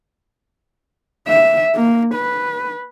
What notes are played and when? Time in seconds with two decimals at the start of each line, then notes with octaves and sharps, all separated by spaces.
1.28 E5
1.75 A#3
2.14 B4